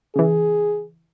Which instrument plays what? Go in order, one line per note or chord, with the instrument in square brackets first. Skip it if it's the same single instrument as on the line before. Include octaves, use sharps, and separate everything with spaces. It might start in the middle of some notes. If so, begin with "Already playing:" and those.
[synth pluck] C#3 E3 [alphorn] G#4